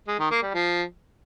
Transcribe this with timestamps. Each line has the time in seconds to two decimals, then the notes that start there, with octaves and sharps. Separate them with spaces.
0.08 G#3
0.19 D#3
0.31 A#3
0.43 G3
0.54 F3